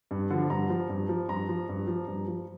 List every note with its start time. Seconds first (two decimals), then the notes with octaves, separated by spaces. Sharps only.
0.11 G2
0.30 D3 F3
0.50 G2 A#5
0.70 F3
0.89 G2
1.09 F3
1.29 G2 A#5
1.49 F3
1.69 G2
1.87 F3
2.07 G2
2.28 F3